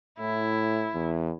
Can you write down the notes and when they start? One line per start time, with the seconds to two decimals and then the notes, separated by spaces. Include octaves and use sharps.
0.19 A2 E4
0.94 E2